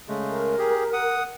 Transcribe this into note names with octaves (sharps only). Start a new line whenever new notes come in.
C#3 G#3 A3
A#4
G4 G#4
F#5 D#6